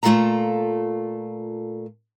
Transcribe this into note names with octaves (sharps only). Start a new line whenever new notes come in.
A#2 A3 F4 A4 F5 A#5